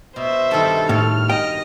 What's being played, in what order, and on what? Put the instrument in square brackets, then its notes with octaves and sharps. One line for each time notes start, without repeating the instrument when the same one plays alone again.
[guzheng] B2 [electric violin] C5 E5
[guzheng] G2 D#3 [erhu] A4
[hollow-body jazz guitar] A2 [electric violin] F6
[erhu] D#5 [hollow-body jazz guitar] G5